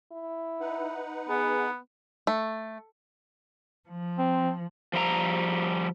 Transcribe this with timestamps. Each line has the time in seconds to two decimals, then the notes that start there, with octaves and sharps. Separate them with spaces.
0.12 E4
0.60 D#4 B4 F#5
1.29 B3 G#4
2.27 A3
3.88 F3
4.19 C4
4.93 F3 G3 E5 A#5